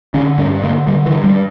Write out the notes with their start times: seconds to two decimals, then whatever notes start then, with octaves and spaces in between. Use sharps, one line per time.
0.14 D3 C#4
0.38 G2 C#4
0.63 D3 A#3
0.87 D3 G3
1.06 E3
1.12 G2
1.24 G3